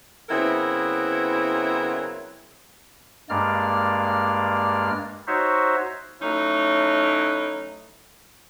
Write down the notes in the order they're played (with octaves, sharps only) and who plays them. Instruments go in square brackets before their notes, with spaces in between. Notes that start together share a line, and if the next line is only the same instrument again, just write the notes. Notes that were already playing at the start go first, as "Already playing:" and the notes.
[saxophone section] C#3 F#3 B3 C4 E4 A#4
[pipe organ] G2 G#3 A#3 D5 F6
D#4 F#4 C5 C#5 E5
[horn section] F#3 A3 C#4 D#4 E4